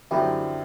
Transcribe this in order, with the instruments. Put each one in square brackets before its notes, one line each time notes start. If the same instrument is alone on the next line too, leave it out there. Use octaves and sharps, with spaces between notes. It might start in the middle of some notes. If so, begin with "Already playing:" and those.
[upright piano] F#2 D3 F#3 C4 [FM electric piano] E4 G4